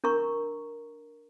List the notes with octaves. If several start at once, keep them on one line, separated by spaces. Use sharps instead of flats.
D4 A#4 A#5 C#6